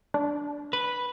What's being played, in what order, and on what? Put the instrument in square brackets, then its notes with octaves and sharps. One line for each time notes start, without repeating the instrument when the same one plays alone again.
[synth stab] D4
[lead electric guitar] B4